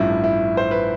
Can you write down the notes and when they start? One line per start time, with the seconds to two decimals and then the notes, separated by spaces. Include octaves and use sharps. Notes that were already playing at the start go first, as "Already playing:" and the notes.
Already playing: A1 G2 F3 E4
0.24 E4
0.57 C5
0.71 B4